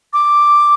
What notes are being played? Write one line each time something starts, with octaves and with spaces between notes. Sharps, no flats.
D6